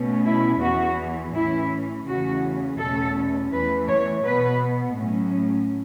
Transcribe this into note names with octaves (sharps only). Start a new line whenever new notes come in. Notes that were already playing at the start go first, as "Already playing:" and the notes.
Already playing: B2 A3 C#4
E4
E2 E3 B3 F#4
A2 E3 C#4 E4
E2 C#3 E3 A3 C#4 F#4
E2 B2 A3 C#4 A4
E2 E3 A3 B4
C#5
B2 B3 B4
A2 F#3 C#4